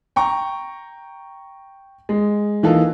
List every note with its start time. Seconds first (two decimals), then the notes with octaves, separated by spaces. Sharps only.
0.16 G5 A#5 C#6
2.09 G#3
2.63 E3 A#3 D#4 F4 A4